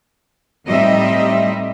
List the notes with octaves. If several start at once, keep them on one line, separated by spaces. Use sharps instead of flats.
A2 G3 C4 D#4 D#5 E5